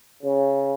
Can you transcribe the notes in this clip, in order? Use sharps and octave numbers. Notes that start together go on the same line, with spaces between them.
C#3